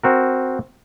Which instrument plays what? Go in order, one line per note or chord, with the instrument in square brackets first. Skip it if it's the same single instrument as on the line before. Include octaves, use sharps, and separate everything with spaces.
[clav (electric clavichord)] C4 F#4 A#4